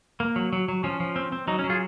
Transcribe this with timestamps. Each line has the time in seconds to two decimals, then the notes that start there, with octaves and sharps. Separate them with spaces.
0.20 A#3
0.36 F#3
0.53 F#3
0.68 F#3
0.84 F3 C#4
1.00 F3
1.16 C4
1.32 C4
1.48 F#3 D#4
1.59 C#4
1.64 F#3
1.70 F4 G#4